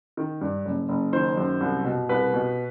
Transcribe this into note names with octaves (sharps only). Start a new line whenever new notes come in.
D#3
G2
F#1
F#1
D#3 C5
F#2
C2
B2
C2 B4
B2